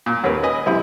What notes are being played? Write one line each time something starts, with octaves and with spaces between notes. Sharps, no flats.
A#2
D#2 C#4 A#4 B4
B4 D#5 G#5
F#2 C3 E4